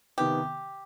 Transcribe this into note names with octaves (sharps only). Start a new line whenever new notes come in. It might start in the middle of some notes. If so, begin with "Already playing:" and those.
C3 D#3 B3 G4